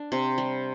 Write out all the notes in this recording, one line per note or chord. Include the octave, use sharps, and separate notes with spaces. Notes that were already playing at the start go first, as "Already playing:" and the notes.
Already playing: D4
C3
G3